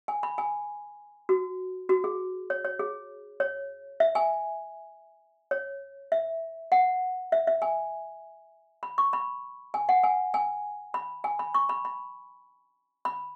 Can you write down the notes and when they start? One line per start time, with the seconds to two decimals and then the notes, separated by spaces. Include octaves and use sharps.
0.08 G#5
0.23 B5
0.38 G#5
1.29 F#4
1.89 F#4
2.04 G#4
2.50 C#5
2.65 C#5
2.79 G#4
3.40 C#5
4.00 E5
4.15 G#5
5.51 C#5
6.12 E5
6.72 F#5
7.32 E5
7.47 E5
7.62 G#5
8.83 B5
8.98 C#6
9.13 B5
9.74 G#5
9.89 F#5
10.03 G#5
10.34 G#5
10.94 B5
11.24 G#5
11.39 B5
11.54 C#6
11.69 B5
11.85 B5
13.05 B5